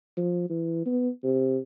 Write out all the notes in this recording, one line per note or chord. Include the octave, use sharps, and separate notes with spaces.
F3
E3
B3
C3